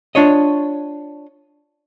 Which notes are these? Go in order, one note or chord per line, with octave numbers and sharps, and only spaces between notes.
D4 F4 C#5 D#5